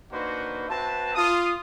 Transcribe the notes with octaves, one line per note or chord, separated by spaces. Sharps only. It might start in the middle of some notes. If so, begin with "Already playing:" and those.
A#3 D4 D#4 F#4 B4 C5
C4 F#4 B4 E5 A5
F4 D#6